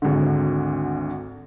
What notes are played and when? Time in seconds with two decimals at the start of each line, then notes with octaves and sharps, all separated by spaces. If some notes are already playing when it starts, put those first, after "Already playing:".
0.02 G#1 D2 G#2 D3